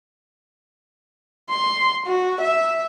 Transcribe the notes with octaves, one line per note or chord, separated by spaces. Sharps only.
C6
F#4
E5